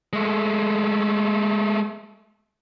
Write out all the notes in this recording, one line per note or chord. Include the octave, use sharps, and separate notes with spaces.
G#3 A3